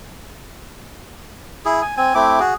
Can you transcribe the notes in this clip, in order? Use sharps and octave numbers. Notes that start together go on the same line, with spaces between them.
E4 G#4
G#5
C4 G#5
A3 C4 E4 D6
F#4 G#4